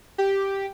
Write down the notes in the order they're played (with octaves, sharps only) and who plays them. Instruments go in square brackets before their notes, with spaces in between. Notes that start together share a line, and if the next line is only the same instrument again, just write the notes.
[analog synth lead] G4